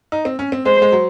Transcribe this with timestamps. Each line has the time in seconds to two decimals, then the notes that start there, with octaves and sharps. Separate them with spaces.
0.12 D#4
0.25 C4
0.39 C#4
0.52 C4
0.65 G#3 C5
0.82 G#3
0.92 F#3